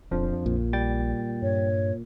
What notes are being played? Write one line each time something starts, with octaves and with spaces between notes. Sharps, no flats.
D#1 F2 F3 D4
A#1 A#2
G3 G5 A6
G2 C#5